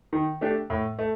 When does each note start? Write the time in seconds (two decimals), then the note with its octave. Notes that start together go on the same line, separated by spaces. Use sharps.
0.13 D#3
0.41 A3 D4 G4
0.70 A2
0.99 A3